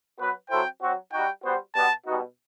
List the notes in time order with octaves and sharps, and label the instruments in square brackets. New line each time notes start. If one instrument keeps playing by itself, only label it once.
[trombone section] F#3 B3 F#4 B4
[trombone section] F#3 C4 E4 A4 C5 [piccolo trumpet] G5
[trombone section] F#3 C4 F#4
[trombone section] G3 D#4 F#4 [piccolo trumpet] G5
[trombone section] G3 B3 F#4 C5
[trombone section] B2 G3 B3 [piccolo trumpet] A5
[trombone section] B2 G3 B3 D#4 F#4